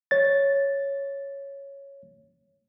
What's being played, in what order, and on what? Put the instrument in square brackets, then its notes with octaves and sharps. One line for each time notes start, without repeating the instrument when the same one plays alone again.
[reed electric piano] C#5 A6